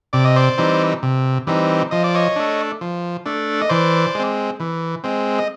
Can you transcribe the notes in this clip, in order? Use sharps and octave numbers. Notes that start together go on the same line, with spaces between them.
C3 D5
D#5
C5 D5
E3 G3 C4 D#4
C3
E3 G3 C4 D#4
F3 D#5
D5
C#5 D#5
A3 D4
F3
A3 D4
D#5
E3 C5 D5
G#3 C4
E3
G#3 C4
D#5